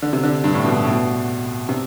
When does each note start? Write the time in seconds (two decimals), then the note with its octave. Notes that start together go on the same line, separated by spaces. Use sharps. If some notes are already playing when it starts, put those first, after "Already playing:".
0.02 D3
0.13 C3
0.23 D3
0.44 G2
0.54 A2
0.65 B2
0.75 B2
0.84 A2
0.91 B2
1.69 C3